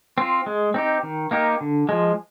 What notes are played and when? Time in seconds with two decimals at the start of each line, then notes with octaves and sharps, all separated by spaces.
0.18 C4 F4
0.46 G#3
0.74 C4 D#4 G4
1.03 D#3
1.31 A#3 D#4 G4 A#4
1.61 D3
1.89 F3 G#3